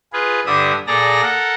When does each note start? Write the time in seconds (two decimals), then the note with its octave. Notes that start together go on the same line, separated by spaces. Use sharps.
0.13 F4 G#4 B4
0.46 G2 D3 D4 E5 D#6
0.87 A#2 G#4 A4 D5 A#5 A#6
1.22 A4 A#4 F#5